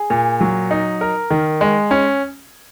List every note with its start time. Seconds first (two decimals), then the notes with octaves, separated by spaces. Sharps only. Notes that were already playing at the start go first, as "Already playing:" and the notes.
Already playing: G#4
0.10 A#2
0.41 F#3
0.71 D#4
1.01 A#4
1.30 D#3
1.61 G#3
1.91 C#4